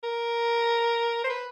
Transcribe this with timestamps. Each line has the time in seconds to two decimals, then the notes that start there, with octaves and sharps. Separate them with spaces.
0.04 A#4
1.24 C5
1.29 B4